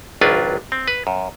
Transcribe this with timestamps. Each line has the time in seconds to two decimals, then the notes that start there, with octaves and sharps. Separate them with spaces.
0.21 G#1 C#2 F#3 D4 F4 B4
0.72 C4
0.88 B4
1.07 F#2